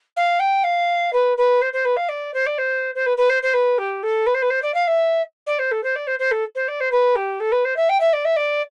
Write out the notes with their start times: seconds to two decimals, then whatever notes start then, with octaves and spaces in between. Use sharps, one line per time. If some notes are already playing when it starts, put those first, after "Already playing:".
0.17 F5
0.40 G5
0.64 F5
1.13 B4
1.37 B4
1.62 C5
1.73 C5
1.85 B4
1.97 F5
2.09 D5
2.34 C5
2.46 D5
2.58 C5
2.95 C5
3.06 B4
3.17 B4
3.30 C5
3.43 C5
3.54 B4
3.78 G4
4.03 A4
4.27 B4
4.34 C5
4.42 B4
4.50 C5
4.62 D5
4.74 F5
4.88 E5
5.47 D5
5.59 C5
5.71 A4
5.84 C5
5.96 D5
6.07 C5
6.19 C5
6.31 A4
6.55 C5
6.68 D5
6.80 C5
6.92 B4
7.16 G4
7.40 A4
7.52 B4
7.65 C5
7.76 E5
7.89 G5
8.00 E5
8.13 D5
8.25 E5
8.37 D5